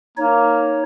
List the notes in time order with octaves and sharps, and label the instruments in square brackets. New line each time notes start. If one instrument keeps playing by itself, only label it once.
[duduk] A#3 [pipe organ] D#4 C#5